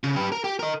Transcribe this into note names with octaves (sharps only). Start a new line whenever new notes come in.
C#3
G4 B4
A#4
G4
A#4 D#5